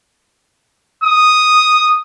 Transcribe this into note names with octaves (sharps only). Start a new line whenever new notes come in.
D#6